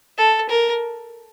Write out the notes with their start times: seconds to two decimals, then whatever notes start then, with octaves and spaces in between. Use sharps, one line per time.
0.18 A4
0.49 A#4